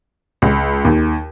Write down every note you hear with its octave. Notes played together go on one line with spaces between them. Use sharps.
C#2
D#2